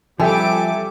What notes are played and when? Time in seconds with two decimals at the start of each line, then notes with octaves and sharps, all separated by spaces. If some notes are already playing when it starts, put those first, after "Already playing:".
0.20 F3 G3 C4 G4 A4 E5 G#5 D6